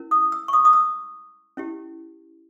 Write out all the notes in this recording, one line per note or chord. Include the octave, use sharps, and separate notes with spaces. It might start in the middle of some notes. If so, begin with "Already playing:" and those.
Already playing: C#4 E4 A#4
D#6
E6
C#6
D#6
D#6
E6
C#4 E4 G4